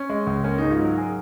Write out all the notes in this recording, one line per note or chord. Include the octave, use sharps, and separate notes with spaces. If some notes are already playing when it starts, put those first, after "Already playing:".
Already playing: C#4
G#3
C#2
A#3 C#4
G#2 D#4
F4
F#3
A#4
G#4